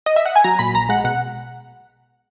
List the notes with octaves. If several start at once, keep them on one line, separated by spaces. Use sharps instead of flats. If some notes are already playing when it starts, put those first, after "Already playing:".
D#5
E5
F#5
G#5
F#3 A#5
A#2 B5
A#1 A#5
G#3 F#5
B2 F#5